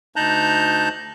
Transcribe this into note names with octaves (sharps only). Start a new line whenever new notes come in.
D2 D#4 A5 A#5 F#6 G6